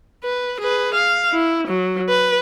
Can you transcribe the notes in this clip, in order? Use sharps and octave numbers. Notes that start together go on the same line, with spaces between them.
B4
G#4 B4
F5
E4
F#3
B4